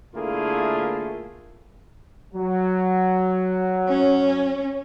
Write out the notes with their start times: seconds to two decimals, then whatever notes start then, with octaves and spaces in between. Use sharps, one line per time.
0.15 D3 A3 A#3 E4 F4 G#4
2.34 F#3
3.88 C#4